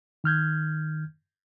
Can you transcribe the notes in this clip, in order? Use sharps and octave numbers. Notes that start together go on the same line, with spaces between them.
D#3 F6 G6 G#6